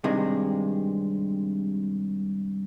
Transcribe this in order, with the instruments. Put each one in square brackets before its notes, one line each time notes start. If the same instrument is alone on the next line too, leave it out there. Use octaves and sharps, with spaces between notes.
[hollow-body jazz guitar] G2 C3 D#3 G#3